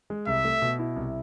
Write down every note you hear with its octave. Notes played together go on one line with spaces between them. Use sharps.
G#3
C2 E5
A3
B2
E4
C2